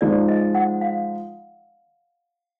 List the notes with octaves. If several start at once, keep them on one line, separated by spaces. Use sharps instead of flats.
F3 G#3 D#4 D5
D#5
F#5
F5